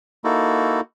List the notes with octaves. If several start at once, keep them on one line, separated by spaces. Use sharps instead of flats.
A#3 D#4 E4 F#4 A4